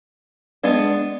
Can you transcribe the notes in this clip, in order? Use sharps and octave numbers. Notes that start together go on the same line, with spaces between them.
G#3 B3 D4